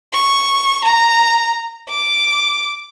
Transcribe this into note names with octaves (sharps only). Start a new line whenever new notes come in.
C#6
A#5
D6